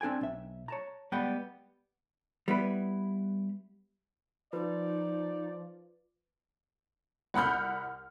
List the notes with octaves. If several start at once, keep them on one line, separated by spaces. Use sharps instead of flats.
C4 D4 G#4 G5 G#5
B1 E5
C#5 A5 A#5
G3 G#3 B3 B4 F#5 G5
G3 B3 E4 B4
F3 D#4 F4 B4 D5
C2 F#5 B5 F6 G6